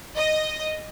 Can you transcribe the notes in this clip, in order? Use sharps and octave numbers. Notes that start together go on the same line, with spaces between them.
D#5